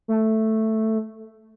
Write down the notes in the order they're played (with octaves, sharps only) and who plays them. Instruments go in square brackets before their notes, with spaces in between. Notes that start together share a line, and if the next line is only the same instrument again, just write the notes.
[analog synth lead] A3